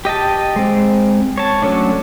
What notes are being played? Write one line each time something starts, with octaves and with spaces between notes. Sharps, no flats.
G4 D#5 G5 A5
G#3 C4
C#5 A5
F#3 A3 C#4 D4